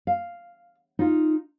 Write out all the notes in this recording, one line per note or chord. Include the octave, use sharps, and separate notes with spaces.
F5
D#4 F4